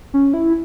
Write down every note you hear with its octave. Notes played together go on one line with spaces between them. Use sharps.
C#4
E4